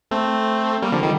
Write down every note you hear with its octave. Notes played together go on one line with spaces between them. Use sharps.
A3 C4
G3 A#3
D3 F3
D#3 G3